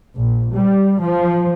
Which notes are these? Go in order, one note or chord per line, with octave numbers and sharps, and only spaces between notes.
A#1
G3
F3